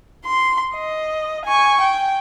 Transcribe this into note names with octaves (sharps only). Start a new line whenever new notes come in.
C6
D#5
G#5 C#6
G5